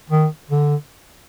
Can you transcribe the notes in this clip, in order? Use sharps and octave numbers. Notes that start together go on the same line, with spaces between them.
D#3
D3